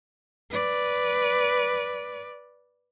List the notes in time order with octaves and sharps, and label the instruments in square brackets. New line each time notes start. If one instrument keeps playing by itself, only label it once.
[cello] B4 D5